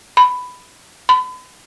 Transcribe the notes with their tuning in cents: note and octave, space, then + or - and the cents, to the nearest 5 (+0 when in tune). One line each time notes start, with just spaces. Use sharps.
B5 +10
B5 +40